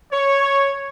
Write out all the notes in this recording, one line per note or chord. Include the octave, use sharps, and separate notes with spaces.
C#5